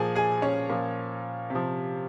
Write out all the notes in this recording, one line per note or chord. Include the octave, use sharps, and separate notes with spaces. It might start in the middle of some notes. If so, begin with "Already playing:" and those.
Already playing: A#2 F3 G#4 G#5
G#4 G#5
C#4 C#5
A#2 F3
C3
F3